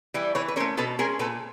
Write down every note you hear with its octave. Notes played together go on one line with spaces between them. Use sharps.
E3 G3
E3 B4 C#5
B4
A3 C#4 A#4 C5
B2 A4 B4
G#3 C#4 G#4 A#4
A#2 A4 B4